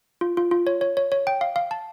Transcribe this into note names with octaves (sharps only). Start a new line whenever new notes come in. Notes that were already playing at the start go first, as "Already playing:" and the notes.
F4
F4
F4
C#5
C#5
C#5
C#5
G5
F5
F5
A5